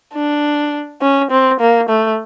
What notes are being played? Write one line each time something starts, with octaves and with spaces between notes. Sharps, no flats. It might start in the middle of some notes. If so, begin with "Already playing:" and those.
D4
C#4
C4
A#3
A3